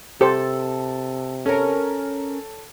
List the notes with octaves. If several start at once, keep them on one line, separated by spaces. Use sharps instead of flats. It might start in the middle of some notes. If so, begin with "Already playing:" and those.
C3 G4 A4 C5
C#4 A4 A#4 C#5 A5